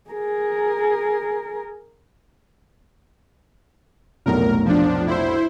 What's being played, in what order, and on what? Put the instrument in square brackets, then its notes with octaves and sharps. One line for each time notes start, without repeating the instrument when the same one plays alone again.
[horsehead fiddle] G#4 A#4
[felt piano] F1 B1 A2 [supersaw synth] A#4
[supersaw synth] F3 D4
E4 C5